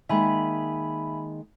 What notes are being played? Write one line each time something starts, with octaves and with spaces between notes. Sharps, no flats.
D#3 G#3 A#3 E5 G#5 B5